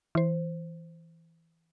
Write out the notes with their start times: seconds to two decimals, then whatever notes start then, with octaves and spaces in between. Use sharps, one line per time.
0.15 E3 C5